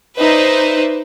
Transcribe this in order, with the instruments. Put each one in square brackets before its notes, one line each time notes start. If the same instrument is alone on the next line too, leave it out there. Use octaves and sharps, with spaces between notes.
[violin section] D#4 B4 C5 D5 E5